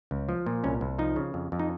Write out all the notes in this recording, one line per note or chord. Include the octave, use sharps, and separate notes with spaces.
C#2
F3
A#2
C2 C#4
C2
F3 D#4
C#3
F2
F2
D#4